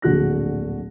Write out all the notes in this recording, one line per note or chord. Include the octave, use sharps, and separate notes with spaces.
D1 A#1 D3 F#4 F#6 A#6